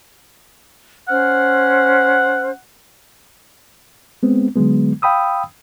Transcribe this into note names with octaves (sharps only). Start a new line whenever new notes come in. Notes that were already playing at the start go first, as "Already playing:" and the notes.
C#4 C5 F#5 F6
G#3 B3 C4
D3 F#3 G#3 B3
F5 G5 B5 D#6 E6